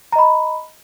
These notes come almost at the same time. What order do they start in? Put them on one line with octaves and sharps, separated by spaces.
A#5 D#5 B5